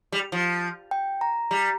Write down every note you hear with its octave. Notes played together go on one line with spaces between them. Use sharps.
G3
F3
G5
A#5
G3 A#5